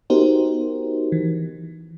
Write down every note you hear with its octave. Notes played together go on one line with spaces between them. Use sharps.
B3 D#4 F#4 G4 A#4 C5
E3